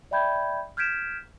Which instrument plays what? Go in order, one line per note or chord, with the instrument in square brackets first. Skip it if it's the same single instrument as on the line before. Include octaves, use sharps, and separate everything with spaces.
[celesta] D5 E5 G5 B5 G6 G#6
F6 G6 G#6 B6 D7 E7